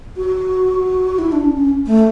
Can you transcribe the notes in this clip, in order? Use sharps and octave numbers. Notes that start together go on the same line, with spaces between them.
F#4
E4
D4
C#4
C#4
A3